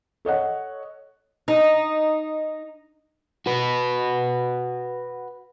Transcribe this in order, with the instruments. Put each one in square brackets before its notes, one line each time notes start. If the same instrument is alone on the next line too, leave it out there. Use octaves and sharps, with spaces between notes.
[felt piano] A4 C#5 D#5 F#5
[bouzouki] D#4
[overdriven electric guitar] F#4 B4